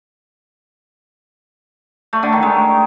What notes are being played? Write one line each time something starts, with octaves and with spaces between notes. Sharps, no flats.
A3
D3
D#3
G#3